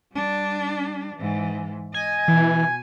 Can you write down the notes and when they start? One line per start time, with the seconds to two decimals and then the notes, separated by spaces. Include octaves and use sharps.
0.13 G3 D4
1.15 G#2 E3
1.94 D#5 G#5
2.28 B2 E3